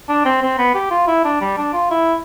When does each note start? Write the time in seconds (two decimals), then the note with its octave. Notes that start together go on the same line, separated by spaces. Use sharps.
0.09 D4
0.25 C4
0.42 C4
0.58 B3
0.74 G4
0.91 F4
1.07 E4
1.24 D4
1.41 G3
1.57 D4
1.73 F4
1.90 E4